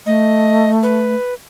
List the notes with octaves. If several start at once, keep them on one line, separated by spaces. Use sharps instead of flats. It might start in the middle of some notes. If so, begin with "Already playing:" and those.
A3 D#5
B4